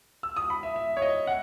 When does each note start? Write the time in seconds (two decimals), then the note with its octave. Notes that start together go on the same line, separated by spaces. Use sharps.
0.23 E6
0.37 D#6
0.50 B5
0.63 E5
0.76 E5
0.97 C#5
1.02 D#5
1.27 F#5